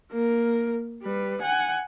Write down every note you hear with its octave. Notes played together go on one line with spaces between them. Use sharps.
A#3 A#4
G3 B4
F#5 G#5